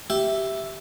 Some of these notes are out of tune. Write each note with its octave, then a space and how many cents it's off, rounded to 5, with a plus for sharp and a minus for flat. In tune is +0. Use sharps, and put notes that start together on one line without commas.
G4 -10 E5 +0